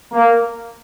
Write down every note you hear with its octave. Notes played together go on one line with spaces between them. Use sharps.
A#3